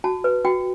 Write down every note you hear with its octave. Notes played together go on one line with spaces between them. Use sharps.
F#4 A5
B4
F#4 G5